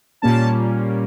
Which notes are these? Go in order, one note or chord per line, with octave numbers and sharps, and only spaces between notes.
A#2 G3 A#3 C#4 A5